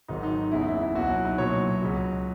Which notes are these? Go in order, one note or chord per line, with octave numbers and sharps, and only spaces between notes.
G#1 G#2 D#3 F#3 D#4
D#4
F#1 E2 C#3 E4
E4
E4
C#2 B2 F#3 F#4
E4
D#4
B1 A#2 F#3 C#5
C#2 C#3 F#3